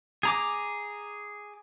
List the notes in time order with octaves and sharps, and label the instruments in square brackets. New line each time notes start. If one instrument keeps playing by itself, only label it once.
[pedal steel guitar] G#4 A#5 D6